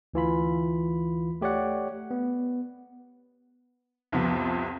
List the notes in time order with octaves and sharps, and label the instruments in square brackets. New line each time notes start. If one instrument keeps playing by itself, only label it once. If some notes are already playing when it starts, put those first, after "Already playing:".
[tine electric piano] D2 E3 F4 B5
A3 G4 C#5 D5 F#5
B3
[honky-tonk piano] C2 F2 C3 F3 B3